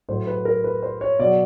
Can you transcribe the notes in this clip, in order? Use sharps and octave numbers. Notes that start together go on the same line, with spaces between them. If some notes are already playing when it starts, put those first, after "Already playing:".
A2 F#3 C5
B4
A#4
B4
C5
C#5
B2 F#3 D5